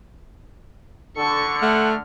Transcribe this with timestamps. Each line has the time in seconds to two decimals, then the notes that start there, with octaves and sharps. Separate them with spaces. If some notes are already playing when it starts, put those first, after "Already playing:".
1.18 D3 A4 C#6 C#7
1.62 A3 F#5 F6